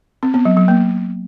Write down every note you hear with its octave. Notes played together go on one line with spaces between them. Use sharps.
C4
B3
F#3
F#3
A#3